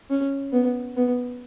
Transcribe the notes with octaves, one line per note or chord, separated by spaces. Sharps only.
C#4
B3
B3